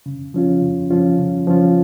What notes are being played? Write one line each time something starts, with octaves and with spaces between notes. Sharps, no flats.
C#3
F3 C#4 F4
C#3
F3 C#4 F4
C#3
F3 C#4 F4